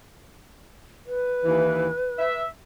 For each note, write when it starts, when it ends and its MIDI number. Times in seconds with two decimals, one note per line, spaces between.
1.06 2.39 71
1.44 1.89 39
1.44 1.89 52
2.18 2.46 76